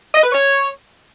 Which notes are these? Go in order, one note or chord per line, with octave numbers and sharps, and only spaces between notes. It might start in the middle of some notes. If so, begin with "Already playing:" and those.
D#5
B4
C#5